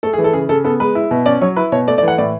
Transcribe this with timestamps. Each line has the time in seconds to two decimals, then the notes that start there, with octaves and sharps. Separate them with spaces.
0.03 A3 A4
0.13 G#4
0.18 E3
0.24 A4
0.33 C#3 G#4
0.49 C#3 A4
0.64 B3 A4
0.80 G#3 B4
0.95 E4
1.11 B2
1.26 C#4 D5
1.41 F#3 C#5
1.56 E4 B4
1.72 B2 C#5
1.87 A3 D5
1.98 D5
2.03 E3 F#5
2.18 A2 D5